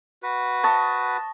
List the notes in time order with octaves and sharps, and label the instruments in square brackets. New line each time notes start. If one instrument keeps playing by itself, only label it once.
[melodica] F#4 B4
[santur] D#5 A5 C#6